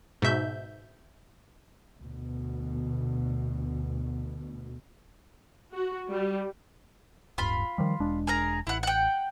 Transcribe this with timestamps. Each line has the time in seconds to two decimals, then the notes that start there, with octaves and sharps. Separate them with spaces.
0.22 G#2 B2 E5 G6
2.00 D2 B2
5.72 F#4
6.08 G3
7.38 D1 G2 F4 B5
7.78 D#3 F3 G3
8.00 E1 G#3 D4
8.27 G#4 A#4 A#5
8.67 A1 E4 F#5
8.83 F#5 G5